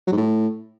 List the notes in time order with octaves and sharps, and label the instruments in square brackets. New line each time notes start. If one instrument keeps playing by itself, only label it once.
[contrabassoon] F#3
G#2
A2